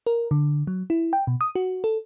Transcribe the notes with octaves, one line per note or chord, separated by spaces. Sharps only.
A#4
D3
F#3
E4
G5
B2
D#6
F#4
A4